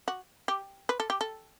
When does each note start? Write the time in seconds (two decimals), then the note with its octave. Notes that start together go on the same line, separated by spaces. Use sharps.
0.08 F#4
0.48 G4
0.89 B4
1.00 A4
1.10 G4
1.21 A4